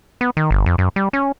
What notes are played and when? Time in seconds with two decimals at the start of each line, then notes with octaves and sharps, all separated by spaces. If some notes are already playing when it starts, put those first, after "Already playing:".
0.21 B3
0.37 D#3
0.51 G1
0.66 F2
0.78 F#2
0.96 G3
1.13 C#4